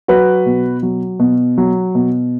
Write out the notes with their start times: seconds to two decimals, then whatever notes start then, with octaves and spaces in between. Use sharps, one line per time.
0.08 F#3 F#4 B4
0.46 B2
0.83 F#3
1.19 B2
1.58 F#3
1.95 B2